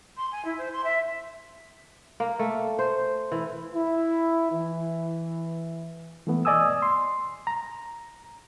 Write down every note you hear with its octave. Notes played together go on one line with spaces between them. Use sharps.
C6
G#5
E4
C5
C6
E5
A#3
A3
C5
E3
E4
E3
E3 A3 B3
D5 D#5 G#5 D#6 E6
C6
A#5